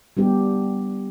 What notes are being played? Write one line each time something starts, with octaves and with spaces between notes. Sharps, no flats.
G3 B3 D4 G4